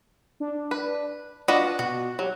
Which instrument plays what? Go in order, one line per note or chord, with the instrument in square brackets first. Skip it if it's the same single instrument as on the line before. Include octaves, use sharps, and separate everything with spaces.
[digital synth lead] D4
[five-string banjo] B4
[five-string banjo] D4 B4 D#5 [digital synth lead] F4 [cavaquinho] F#4
[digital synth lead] B2 [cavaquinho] F#4
[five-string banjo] F#3 [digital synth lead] G3